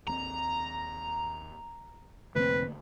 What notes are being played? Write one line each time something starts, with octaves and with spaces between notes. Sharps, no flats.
D#2 B3 C4 A#5
F1 B2 D3 A3 A#3 C4 B4